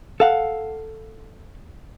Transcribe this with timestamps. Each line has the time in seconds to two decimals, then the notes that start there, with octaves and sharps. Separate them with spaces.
0.20 A4 F5 F#5